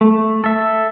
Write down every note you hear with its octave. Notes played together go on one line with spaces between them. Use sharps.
A3
A4 E5